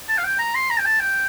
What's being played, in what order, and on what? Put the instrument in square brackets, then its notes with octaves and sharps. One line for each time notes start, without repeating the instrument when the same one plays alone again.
[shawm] A5
F5
G5
A#5
C6
A#5
G5
A5
G5